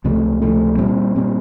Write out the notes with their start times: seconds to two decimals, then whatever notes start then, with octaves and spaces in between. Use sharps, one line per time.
0.04 C#2 C3 F3 A3
0.42 C#2 C3 F3 A3
0.78 A#2 G3 C4
1.16 A#2 G3 C4